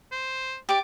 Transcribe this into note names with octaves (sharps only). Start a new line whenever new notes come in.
C5
G4 D5 D6